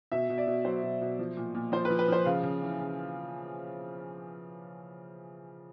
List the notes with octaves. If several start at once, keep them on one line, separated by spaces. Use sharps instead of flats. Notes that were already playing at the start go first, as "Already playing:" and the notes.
B2 E5
B2
D5
B2
F#3 C5
B2
B2
F3
A#2
A#2
F3 C5
B4
F3
B4
F3 C5
C#3 F5
C#3
E3
C#3